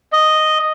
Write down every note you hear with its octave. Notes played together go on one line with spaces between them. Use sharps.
D#5